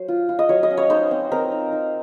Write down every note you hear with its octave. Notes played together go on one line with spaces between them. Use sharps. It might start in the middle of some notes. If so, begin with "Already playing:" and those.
Already playing: F#3 C5
F4
F4
D#5
F#3 C#5
D#5
C#4
C#5
D#4 C5
C4
C4 A#4
D#4
D#4